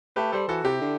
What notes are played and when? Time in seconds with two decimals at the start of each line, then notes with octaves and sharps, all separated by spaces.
0.16 A3 G4 B4
0.32 G3 A4 C5
0.48 E3 F#4 A4
0.64 C3 E4 G4
0.81 D3